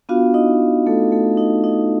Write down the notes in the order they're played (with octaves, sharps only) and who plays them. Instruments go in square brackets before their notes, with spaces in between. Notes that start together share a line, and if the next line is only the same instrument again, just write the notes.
[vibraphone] B3 D4 F4 F#4 F5
D#4 D#5
A3 A4
A3 A4
D#4 D#5
D#4 D#5